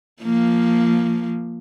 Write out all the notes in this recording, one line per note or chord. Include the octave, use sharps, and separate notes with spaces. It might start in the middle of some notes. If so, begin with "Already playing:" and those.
F3 A#3